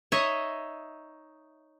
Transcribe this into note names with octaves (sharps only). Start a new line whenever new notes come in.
D#4 C#5 D#5 E5